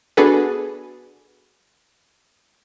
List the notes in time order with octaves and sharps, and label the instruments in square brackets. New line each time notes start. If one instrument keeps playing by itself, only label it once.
[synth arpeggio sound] B3 D4 F#4 G#4 A4 B4